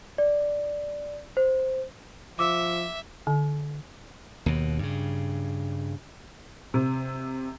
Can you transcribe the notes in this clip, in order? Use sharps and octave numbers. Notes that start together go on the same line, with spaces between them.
D5
C5
F3 E5 D6 E6
D3
D#2 B2
G2 C#3
C3